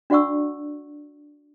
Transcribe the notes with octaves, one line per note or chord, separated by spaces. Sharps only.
D4 F#4 D5 F#5 C#6 E6